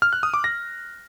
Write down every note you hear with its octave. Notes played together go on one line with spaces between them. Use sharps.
F6
F#6
D#6
D6
A#6